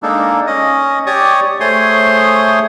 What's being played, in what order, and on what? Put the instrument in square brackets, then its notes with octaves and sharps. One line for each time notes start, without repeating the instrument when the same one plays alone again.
[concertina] G#3 A#3 D4 D#4 A4
C#4 D#5
G4 C#5 D5 C#6 D#6
A3 G#4 C5 C#5 C6 D#6